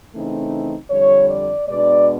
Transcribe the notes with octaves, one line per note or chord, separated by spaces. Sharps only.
C#3 E3 A3 C4 D#4
F2 D3 G3 C#5
D5
B2 G#3 B3 D4 D5